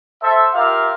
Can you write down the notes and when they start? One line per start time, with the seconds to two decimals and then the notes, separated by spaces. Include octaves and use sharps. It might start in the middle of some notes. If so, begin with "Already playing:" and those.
0.22 A4 C5 E5
0.54 F4 G4 A#4 E5 F5